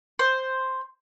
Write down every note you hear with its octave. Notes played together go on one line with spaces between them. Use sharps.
C5